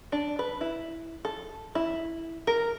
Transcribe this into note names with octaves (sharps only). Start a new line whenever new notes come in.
D4
B4
E4
A4
E4
A#4